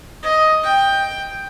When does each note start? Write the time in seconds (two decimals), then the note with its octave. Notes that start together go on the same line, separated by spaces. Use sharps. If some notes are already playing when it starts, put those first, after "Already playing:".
0.23 D#5
0.63 G5